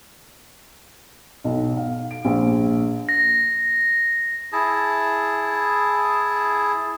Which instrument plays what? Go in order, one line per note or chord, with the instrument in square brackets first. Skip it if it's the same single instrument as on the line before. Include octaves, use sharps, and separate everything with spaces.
[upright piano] B1
F5
D7
A#1
[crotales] A#6
[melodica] E4 G#4 A5